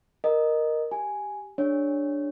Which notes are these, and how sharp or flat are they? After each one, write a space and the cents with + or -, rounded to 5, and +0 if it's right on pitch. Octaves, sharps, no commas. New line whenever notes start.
A#4 +0 D#5 -10
G4 +0 G#5 +0
D4 +0 G#4 -45 C#5 +0